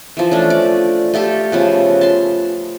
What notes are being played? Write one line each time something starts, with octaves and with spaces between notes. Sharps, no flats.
E3 F3
A3 C#4 D4
D5
A3 F4 G4 A4
C#3 F3 B3
A5 C6